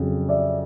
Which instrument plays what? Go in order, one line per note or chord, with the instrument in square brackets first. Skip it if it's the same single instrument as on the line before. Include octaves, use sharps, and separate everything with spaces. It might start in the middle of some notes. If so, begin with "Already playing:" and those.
Already playing: [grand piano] F2 C#3 F#3
D5 E5